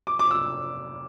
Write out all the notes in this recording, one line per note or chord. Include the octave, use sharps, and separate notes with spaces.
D6
D6
E6